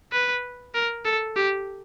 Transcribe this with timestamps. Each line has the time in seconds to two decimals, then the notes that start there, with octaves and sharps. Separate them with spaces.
0.13 B4
0.75 A#4
1.05 A4
1.36 G4